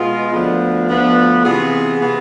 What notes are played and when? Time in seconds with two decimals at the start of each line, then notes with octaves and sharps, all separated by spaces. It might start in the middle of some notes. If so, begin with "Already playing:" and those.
Already playing: B2 G#3 B3 F4
0.33 D2 D3 F3 B3
0.89 D2 D3 F3 B3
1.45 C3 E3 B3 F4 G#4
2.00 C3 E3 B3 F4 G#4